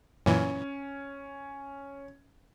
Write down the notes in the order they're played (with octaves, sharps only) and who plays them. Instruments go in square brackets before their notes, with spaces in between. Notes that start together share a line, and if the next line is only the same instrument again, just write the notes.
[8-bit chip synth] F#2 A#2 E3 [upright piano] C#4